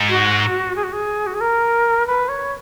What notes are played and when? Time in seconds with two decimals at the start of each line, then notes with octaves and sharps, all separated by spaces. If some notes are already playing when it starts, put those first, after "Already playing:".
Already playing: G#2
0.09 F#4
0.76 G#4
0.83 F#4
0.93 G#4
1.27 F#4
1.34 G#4
1.41 A#4
2.07 B4
2.29 C#5